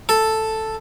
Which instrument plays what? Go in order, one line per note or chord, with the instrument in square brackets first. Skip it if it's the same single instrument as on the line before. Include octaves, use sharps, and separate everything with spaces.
[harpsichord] A4